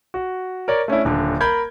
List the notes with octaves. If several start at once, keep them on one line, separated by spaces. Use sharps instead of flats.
F#4
A#4 C#5 D5
A3 C#4 D4 E4
D#1 D3
A#4 B5 G6 G#6